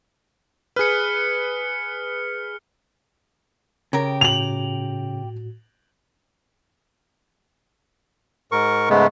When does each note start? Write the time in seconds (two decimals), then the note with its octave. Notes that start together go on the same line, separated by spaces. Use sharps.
0.76 G#4 B4 F6 C#7
3.93 C#3 G4 A#4 G5
4.21 A2 F#4 F7 F#7
8.52 G#2 A#4 C#6
8.90 G#2 C#3 G#3 A3 B3